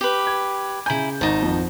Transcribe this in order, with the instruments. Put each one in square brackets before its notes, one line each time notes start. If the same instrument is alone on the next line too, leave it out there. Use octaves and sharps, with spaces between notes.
[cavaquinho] G4 B4
[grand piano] G#6
[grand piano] C#3 A#5 G6 [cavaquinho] E4 G#5
[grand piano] G#1 [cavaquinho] D#4 A5
[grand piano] G#1 F2